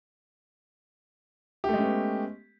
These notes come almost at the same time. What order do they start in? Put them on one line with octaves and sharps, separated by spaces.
G4 A3 G#3 C#4 B3